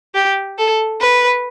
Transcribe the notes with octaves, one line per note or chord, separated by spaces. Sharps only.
G4
A4
B4